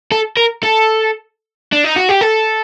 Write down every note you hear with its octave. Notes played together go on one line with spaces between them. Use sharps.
A4
A#4
A4
D4
D#4
F#4
G4
A4